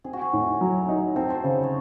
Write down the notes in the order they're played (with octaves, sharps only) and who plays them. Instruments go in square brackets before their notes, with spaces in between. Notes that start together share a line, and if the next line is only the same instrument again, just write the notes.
[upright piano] C4 [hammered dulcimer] G#4
[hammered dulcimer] F#4
G#4
[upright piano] A2
F#3
D#4
[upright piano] C4 [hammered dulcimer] A4
[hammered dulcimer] C5
[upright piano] C#3 [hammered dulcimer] A4
[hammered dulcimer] C#5